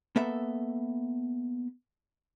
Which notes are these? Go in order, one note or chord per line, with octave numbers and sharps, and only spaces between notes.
A#3 B3 A4 E5